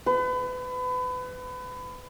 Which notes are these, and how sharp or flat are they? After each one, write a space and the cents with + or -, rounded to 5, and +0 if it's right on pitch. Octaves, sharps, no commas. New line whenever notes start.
B4 +30